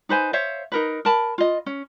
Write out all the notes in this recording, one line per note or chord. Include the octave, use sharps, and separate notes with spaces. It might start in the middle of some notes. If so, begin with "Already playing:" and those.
D#4 B4 C5 G#5
C5 C#5 E5 F5
D#4 A#4 B4
A#4 A5 B5
F4 D#5
C#4